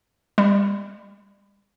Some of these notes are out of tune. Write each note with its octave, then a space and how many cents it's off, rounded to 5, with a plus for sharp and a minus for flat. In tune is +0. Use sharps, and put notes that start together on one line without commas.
G3 +40